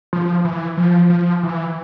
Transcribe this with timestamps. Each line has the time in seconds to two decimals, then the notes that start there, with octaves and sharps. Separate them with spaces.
0.13 F3
0.45 E3
0.77 F3
1.10 F3
1.43 E3